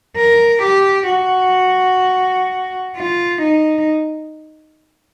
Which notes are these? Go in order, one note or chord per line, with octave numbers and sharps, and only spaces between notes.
A#4
G4
F#4
F4
D#4